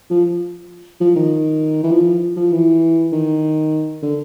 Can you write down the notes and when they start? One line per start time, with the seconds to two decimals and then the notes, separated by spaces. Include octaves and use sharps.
0.10 F3
1.01 F3
1.16 D#3
1.83 E3
1.91 F3
2.37 F3
2.52 E3
3.12 D#3
4.02 D3